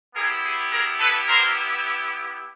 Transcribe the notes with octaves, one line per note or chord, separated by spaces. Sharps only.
B3 E4 G4 G#4 A#4
G#4
G#4 A#4
A4 B4
A#4 C5